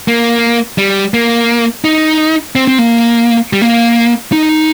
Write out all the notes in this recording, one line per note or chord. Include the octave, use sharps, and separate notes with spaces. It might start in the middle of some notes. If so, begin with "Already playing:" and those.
A#3
G3
A#3
D#4
C4
C4
A#3
G3
A#3
D#4